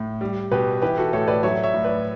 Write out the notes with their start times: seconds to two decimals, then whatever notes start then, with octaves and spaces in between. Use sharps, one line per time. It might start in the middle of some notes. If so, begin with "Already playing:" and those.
Already playing: A2
0.21 G3
0.51 B2 G4 B4
0.82 E3 G4 B4
0.97 F#4 A4
1.13 A2 A4 C#5
1.28 B4 D5
1.43 F#3 C#5 E5
1.63 C#5 E5
1.74 A2
1.84 B4 D5